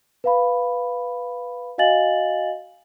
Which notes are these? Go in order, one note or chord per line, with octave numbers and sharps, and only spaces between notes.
B4 F5 B5
F#4 D#5 F5 G#5 A6 F#7